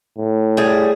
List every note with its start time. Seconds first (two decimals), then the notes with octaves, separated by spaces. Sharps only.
0.18 A2
0.57 G3 G#4